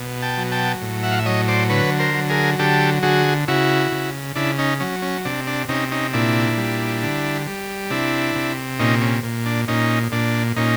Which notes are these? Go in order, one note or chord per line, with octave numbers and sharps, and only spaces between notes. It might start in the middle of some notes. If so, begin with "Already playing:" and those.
Already playing: B2
G5 A5
F#3
G5 A5
A2
E5 F#5
F5
E5
F#3 C#5 D#5
C5 D5
D3 B4 C#5
A#4 C5
F#3
G#4 A#4
D3 G4 A4
D3 F#4 G#4
C#3 E4 F#4
C#3
C#3 D4 E4
C#4 D#4
F#3 C#4
C#4
C3 D4
D4
C3 C#4 D#4
C#4 D#4
A#2 D4 E4
G3
D3
G3
C3 D4 E4
C3
A#2 C#4 D#4
C#4
A#2
D4
A#2 C#4 D#4
A#2 D4
A#2 C#4 D#4